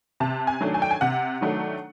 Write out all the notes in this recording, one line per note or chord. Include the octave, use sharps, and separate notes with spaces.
C3 A5
G#5
D#3 F#3 A3 D4
G#5
G5
G#5
C3 F#5
D#3 F#3 A3 D4